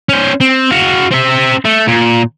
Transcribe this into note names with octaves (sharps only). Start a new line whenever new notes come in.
C#4 C5
C4
F#4 F5
C4 E5
A3
A#2